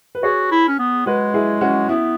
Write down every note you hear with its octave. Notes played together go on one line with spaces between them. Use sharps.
B4
F#4 G#4 C#5
E4
C#4
B3
G#3 F#4 B4
E4 G#4
C#4 F#4
B3 E4